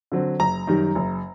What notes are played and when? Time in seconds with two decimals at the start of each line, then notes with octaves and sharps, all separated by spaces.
0.12 D3 F#3 C4
0.39 F#1 A#5
0.67 F#2 D#3 G3
0.95 F#1